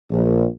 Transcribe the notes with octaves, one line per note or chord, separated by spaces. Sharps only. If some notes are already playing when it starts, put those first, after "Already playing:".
A#1